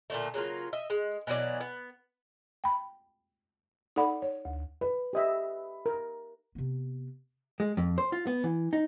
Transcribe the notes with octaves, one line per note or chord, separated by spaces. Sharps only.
A#2 D3 A3
C#3 F#3 A#3 F4
D#5 E5
G#3
B2 E3 F#3 D5
B3
G5 B5
D#4 A4 D5 F#5 B5
C#5
D2
B4
G4 D#5 E5
A#4
C3 B3
G#3
F2
C5
F4
B3
E3
D#4